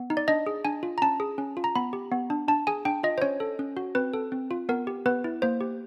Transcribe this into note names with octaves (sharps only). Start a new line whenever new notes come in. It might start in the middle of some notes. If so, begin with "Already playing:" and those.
Already playing: B3
D#4
D5
D4 D#5
G#4
D4 G#5
F4
A#5
C#4 A5
G#4
C#4
F4
A#5
B3 B5
G4
B3
D4
D4 A5
G#4 G#5
D4 G5
F4 D#5
C5
C#4 C#5
A4
C#4
F#4
C4 B4
A4
C4
F4
B3 A#4
G4
B3 B4
E4
A#3 C5
G4